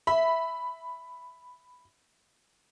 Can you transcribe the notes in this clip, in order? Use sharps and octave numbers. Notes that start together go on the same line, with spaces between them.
E5 B5